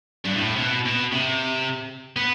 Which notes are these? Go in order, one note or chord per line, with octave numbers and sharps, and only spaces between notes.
G2
A2
C3
B2
B2
C3
B3